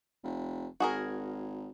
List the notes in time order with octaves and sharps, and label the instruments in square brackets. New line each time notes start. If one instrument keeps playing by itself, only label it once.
[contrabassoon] F1
[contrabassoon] G#1 [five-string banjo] F#4 G#4 A#4